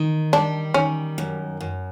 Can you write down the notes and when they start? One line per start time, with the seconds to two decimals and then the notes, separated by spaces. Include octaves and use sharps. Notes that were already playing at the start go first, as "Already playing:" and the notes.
Already playing: D#3
0.33 G3 D4
0.74 D#3 C#4
1.18 F#2
1.61 F#2